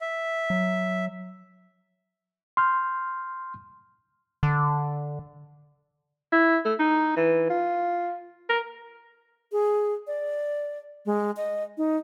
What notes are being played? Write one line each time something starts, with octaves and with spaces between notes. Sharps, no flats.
E5
F#3
C6 F6 G6
D3
E4
A3
D#4
E3
F4
A#4
G#4
D5
G#3
D#5
D#4